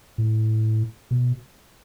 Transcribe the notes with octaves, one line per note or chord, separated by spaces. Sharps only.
A2
B2